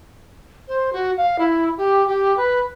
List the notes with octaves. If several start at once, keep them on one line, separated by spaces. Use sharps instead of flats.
C5
F#4
F5
E4
G4
G4
B4